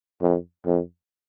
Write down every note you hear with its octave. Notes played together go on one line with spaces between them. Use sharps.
F2
F2